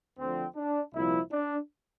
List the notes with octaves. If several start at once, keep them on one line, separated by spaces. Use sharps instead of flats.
D2 D3 F3 C4
D4
C2 A#2 F3 E4
D4